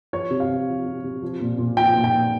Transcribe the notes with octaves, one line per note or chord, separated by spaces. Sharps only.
F3 C#5
C3
F5
C3
F3
C3
C3
F3
A#2
A#2
F3 G5
A#2
G5
A#2